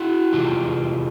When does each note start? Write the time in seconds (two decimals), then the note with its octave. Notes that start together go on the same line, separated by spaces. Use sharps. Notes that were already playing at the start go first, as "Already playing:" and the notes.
Already playing: E4 F#4
0.32 E2 C3 E3 G#3 F4 G4